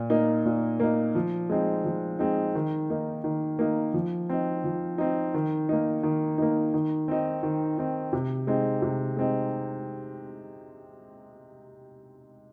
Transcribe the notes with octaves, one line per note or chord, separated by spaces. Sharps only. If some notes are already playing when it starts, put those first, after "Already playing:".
Already playing: A#2
A#3 D#4
A#2
A#3 D#4
F3
G#3 C4 D#4
F3
G#3 C4 D#4
D#3
A#3 D#4
D#3
A#3 D#4
F3
C4 D#4
F3
C4 D#4
D#3
A#3 D#4
D#3
A#3 D#4
D#3
C4 D#4
D#3
C4 D#4
C3
G#3 C4 D#4
C3
G#3 C4 D#4